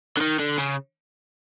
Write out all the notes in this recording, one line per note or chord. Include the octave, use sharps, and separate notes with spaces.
D3
D#3
D3
C#3